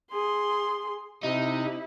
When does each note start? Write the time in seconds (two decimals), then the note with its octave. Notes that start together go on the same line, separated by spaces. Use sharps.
0.11 G#4 C6
1.23 C3 D#4 E4